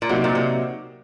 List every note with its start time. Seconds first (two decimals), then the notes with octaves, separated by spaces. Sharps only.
0.02 A#2
0.09 C3 F#3 A#3 D#4 F#4
0.24 A#2
0.35 C3